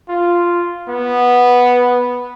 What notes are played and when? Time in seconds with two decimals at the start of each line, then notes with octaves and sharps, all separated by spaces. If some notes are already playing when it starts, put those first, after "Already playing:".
0.08 F4
0.88 B3